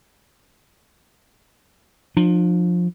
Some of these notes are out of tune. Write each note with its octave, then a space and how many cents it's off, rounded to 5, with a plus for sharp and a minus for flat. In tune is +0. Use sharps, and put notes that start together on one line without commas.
F3 +20 D4 +40